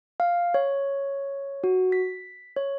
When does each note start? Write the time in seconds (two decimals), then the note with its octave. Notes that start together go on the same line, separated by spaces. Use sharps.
0.20 F5
0.54 C#5
1.64 F#4
1.92 B6
2.56 C#5